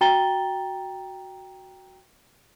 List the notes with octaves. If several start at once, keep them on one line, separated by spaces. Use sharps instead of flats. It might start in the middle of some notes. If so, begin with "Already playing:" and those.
F#4 G5 A#5 A6 G7